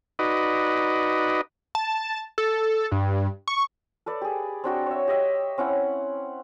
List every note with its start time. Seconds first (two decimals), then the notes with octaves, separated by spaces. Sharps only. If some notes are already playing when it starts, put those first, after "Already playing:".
0.19 D#4 F#4 B4 D5 D#5
1.75 A5
2.38 A4
2.92 G2
3.48 C#6
4.06 A4 B4 D5
4.21 G4 G#4
4.64 C4 D4 F#4 G5
4.86 C#5 E5
5.08 G4 D#5 E5
5.58 C4 C#4 E4 F#5